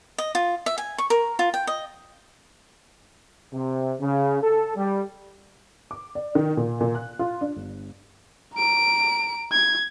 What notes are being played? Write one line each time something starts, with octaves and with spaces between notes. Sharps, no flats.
D#5
F4
E5
G#5
C#6
A#4
F4
G5
D#5
C3
C#3
A4
G3
D6
D5
D#3
A#2
A#2
F#6
F4
D4
G1
A#5 D7
G#6